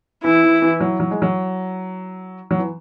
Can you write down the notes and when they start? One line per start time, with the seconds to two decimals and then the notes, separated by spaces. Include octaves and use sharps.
0.24 E3 E4
0.43 E3
0.62 E3
0.81 F#3
1.00 F#3
1.11 G#3
1.22 F#3
2.51 F#3
2.59 E3